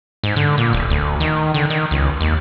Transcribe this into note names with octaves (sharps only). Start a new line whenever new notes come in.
G#2
D3
A#2
D1
D2
D#3
D3
D#3
C#2
D#2